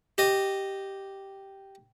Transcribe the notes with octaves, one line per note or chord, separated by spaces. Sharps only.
G4 D#5